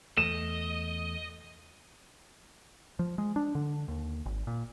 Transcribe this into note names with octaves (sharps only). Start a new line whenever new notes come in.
E2 A3 D#5 E7
F3
G#3
D4
D3
D#2
G#1
A#2